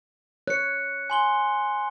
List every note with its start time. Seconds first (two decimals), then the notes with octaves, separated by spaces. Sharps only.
0.47 C#5 F#6 C#7
1.10 G#5 C6 G7